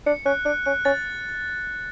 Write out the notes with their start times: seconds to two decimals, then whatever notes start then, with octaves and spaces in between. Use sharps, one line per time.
0.06 D4 C#7
0.26 C#4 F#6
0.45 D4 F#6
0.66 C#4 F#6
0.85 C#4 A6